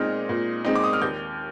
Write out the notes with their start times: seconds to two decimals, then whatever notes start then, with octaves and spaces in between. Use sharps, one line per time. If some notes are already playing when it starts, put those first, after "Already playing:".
Already playing: A#2 G#3 C4 D#4 F6
0.29 A#2
0.65 G#3 C4 D#4
0.75 D6
0.84 D#6
0.93 F6
1.02 D#2 G6